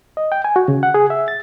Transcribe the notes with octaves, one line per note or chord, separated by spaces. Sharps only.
D#5
G5
G#5
F#4
C#3
F#5
G#4
E5
A6